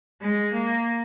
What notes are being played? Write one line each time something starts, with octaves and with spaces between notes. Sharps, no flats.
G#3
A#3